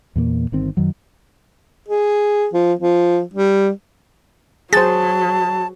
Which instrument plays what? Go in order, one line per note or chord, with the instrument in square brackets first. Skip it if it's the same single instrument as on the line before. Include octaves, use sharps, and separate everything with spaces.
[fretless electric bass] E2 A#2 A3 A#3
G1 D#3 C4
F#2 D#3 F#3
[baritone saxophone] G#4
F3
F3
G3
[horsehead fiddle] F#3 [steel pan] G#4 C5 [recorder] A5 [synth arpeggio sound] A6